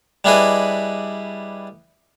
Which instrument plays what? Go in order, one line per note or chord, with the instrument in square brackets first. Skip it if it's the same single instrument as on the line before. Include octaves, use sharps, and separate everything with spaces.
[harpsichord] G3 D4 E4 G#4 B4 D#5